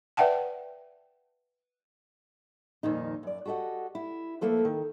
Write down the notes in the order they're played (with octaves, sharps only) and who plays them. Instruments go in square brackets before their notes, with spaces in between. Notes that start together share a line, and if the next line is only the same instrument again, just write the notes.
[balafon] B4 D5 E5 F#5 G5 A5
[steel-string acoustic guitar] F2 A#2 D#3 D#4
F#2 D5
F#4 G4 A4 D#5 F#5
E4
F3 A3 A#3 A4 B4
D#3